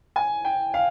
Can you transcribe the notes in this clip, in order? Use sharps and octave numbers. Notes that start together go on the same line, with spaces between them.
G#5
G5
F5